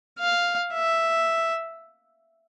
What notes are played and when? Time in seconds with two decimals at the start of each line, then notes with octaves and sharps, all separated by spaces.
0.19 F5
0.74 E5